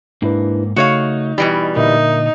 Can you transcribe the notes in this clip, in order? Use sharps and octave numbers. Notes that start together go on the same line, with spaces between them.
G#2 A#3 D4 E4 B4
C#3 A3 D#4 F#4 C#5 F5
B2 E3 G3 B5
A#2 D3 D#4 A#4 E5